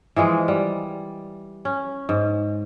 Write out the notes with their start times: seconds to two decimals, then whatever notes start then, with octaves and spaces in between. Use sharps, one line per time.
0.16 E3 F3 G#3
0.48 G3
1.65 C#4
2.09 G#2